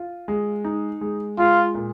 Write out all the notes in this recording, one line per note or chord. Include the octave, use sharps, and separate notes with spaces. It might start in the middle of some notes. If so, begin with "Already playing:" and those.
Already playing: F4
G#3
D#4
G#3
G#3 F4
A#2